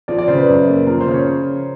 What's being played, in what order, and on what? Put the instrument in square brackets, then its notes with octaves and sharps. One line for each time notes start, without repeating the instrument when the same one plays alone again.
[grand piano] F3 [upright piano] D5
[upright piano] D5
[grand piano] C#3 [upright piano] C5
[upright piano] B4
[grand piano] F#2
A#3
[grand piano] F3 [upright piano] A#4
[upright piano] C5
[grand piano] C#3
[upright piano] C#5